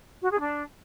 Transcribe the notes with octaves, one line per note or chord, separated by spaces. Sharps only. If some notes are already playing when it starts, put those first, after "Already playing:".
F#4
G#4
D4